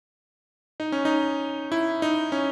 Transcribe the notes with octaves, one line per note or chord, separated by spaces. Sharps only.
D#4
C#4
D#4
E4
D#4
C#4